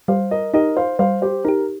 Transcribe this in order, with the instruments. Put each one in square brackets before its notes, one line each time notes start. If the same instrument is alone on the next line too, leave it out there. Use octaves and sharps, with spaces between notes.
[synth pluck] G3 [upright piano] C5 F5
[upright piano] A#4 D#5
[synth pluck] D#4 G4 [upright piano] A#4 D#5
[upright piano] C5 F5
[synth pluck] G3 [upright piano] C5 F5
[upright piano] G4 C5
[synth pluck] D#4 G4 [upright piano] A#4